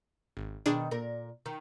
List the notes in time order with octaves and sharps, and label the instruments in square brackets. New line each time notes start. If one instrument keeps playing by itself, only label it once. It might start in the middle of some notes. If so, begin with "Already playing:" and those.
[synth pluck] G#1
[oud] B2 D#3 [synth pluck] D4 G#4
[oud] A#2 A#4
D#3